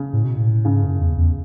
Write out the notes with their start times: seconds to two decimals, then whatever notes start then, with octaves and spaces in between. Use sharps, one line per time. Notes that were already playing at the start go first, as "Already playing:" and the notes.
Already playing: C#3
0.13 A2
0.24 B2
0.36 A2
0.65 G#2 C#3
0.83 F#2
1.00 E2
1.17 E2